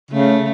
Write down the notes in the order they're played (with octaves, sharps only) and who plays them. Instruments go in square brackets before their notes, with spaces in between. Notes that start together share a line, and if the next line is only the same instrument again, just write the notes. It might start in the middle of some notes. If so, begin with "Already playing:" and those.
[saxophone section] C#3 [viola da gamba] A3